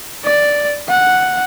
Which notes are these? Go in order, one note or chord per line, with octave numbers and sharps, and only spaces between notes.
D5
F#5